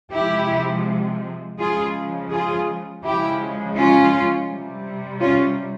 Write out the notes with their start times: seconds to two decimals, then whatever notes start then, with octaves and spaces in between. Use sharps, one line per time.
0.13 C3 F3 G#3 E4 G4
1.58 C#3 F3 G#3 F4 G#4
2.30 F4 G#4
3.03 C#3 F3 G#3 E4 G4
3.75 C#4 F4
4.49 C3 G3
5.20 C#4 F4